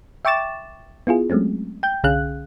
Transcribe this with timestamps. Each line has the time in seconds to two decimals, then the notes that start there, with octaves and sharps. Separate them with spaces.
0.25 E5 G5 C#6 D6 A6 E7
1.07 B3 E4 F4 G#4
1.30 F#3 G#3 A3 C4 C#4
1.83 G5 G6
2.04 C2 D3 C#4 G#4 F5 F#6